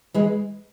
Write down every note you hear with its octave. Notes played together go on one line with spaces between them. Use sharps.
E3 G#3